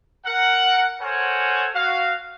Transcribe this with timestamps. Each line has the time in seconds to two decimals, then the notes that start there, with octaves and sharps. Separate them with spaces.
0.25 A#4 F#5
1.00 A4 A#4 C5 C#5 F#5 G#5
1.73 F#4 F5